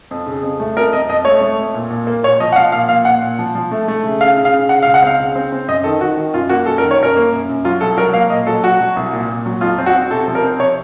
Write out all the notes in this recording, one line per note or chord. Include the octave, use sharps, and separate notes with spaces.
F2
C#3
F2
A3
F2 A#4
F2 D#5
F2 D#5
A3 C#5
A3
F2
A#2
A#2
A#3
A#2 C#5
F3 D#5
F#5
F3 F5
A#2 F5
A#2 F5
A#2 F#5
A#2
F3
F3
A3
A3
C#3
C#3 F5
C#3
F5
C#3
C#3 F#5
F5
C#2
F#5
C4 F5
C#3
C4
C4
F#2 D#5
D#3 A4
D#3 F#4
D#3
F#2 F4
A#3 F#4
F#2 A4
A#4
D#3
C#5
F#2 A#4
A#3
F#2
F#2
F#3 F4
C2 A4
F#3 A#4
A#3 F5
A#2 D#5
F#3 A4
F#3 F#4
F#3
C2
A#2
A#2
F#3
F2 F4
C4
F#4
C4
C3 A4
F3
A#4
C4
C3 C#5